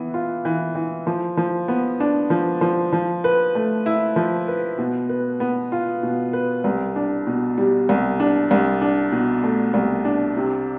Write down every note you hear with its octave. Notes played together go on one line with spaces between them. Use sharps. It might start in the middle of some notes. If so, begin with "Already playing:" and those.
Already playing: E3 B3
F4
E3
E3
F3
F3
B3
D4
F3
F3
F3
B4
A3
E4
F3
B4
B2
B4
B3
F4
B2
B4
C2
D4
B2
G3
C2
D4
C2
D4
B2
A3
C2
D4
C3